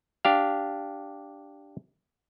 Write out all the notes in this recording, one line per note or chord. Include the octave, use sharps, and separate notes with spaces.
D4 G4 F5